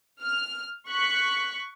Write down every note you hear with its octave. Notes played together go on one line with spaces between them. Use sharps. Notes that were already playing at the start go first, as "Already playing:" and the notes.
F6
C#6 F#6 B6